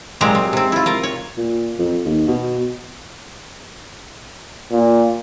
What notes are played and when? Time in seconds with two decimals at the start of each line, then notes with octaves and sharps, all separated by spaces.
0.21 A#2 F#3 G#3 C4 G4 A#5
0.35 C4
0.53 C3 C4
0.72 E4 F4
0.86 F4 A#4
1.03 C#5
1.37 A#2
1.79 F2
2.05 D#2
2.28 B2
4.72 A#2